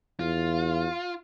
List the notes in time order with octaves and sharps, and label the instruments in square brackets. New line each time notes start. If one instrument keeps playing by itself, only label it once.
[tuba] E2 [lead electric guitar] F4